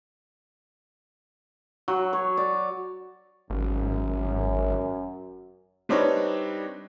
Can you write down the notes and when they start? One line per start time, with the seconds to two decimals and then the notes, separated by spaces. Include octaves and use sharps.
1.88 F#3
2.13 C#5
2.37 D5
3.50 G#1 F#2
5.89 G3 C4 D4 D#4 B4 C#5